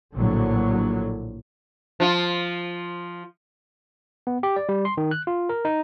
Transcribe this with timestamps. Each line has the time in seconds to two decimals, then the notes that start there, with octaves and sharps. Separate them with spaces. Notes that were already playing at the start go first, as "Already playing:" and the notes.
0.16 A#1 A2 D3 F#3
2.00 F3 F4
4.27 B3
4.43 G4
4.56 D5
4.69 G3
4.85 C6
4.97 D#3
5.11 F#6
5.27 F4
5.49 A#4
5.65 D#4